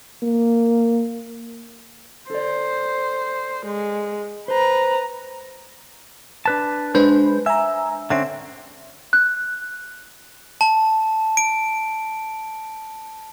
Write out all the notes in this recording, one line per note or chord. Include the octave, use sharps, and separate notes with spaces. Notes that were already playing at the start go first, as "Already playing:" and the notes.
A#3
A4 C5 D5
G#3
B4 C5 A#5
D4 B4 A5
G#3 D4 B4 C5
E5 G#5 A#5
D3 C4 C#4 E5
F#6
A5
D7